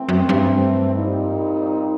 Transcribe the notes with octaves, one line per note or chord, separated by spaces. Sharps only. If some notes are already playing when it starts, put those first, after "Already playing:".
Already playing: E3 A3 C4
F#2
G2
A#2 G3 C4 D#4 G4